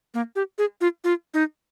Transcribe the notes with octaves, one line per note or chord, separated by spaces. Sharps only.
A#3
G4
G#4
F4
F4
D#4